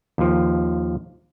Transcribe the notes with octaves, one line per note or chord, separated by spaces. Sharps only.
D#2 F3